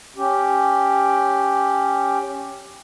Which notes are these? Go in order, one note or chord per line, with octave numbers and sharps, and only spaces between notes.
C#4 G4